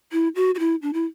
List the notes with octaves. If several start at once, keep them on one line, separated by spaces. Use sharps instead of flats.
E4
F#4
F#4
E4
D4
E4